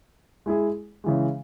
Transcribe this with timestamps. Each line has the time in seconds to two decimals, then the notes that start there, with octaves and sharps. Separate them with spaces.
0.46 G#3 E4 G#4
1.04 C#3 E3 G#3